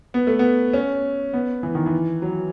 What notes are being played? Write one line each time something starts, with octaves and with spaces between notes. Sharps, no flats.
B3
A3
B3
C#4
B3
E3
D#3
E3
F#3